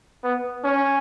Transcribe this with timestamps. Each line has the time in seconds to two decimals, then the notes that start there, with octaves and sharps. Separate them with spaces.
0.24 B3
0.64 C#4